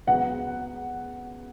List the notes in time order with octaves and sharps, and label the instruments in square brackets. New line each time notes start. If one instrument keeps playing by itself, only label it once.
[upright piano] C#2 C#3 F#3 B3 F#5